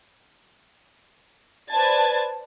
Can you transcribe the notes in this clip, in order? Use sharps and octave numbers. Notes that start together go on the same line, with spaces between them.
B4 C5 D5 A5 G#6 A6